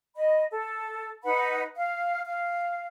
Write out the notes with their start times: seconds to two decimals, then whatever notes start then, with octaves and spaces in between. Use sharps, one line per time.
0.15 D#5 B5
0.51 A4
1.24 D#4 B4 F#5 B5
1.76 F5
2.24 F5